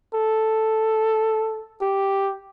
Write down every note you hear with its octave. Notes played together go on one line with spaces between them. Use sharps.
A4
G4